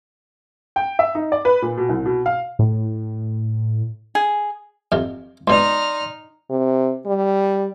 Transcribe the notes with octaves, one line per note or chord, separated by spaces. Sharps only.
G5
E5
D#4
D5
B4
A#2
B2
C2
B2
F5
A2
G#4
F2 C3
C#2 B2 D#4 D5 C6 F6
C3
G3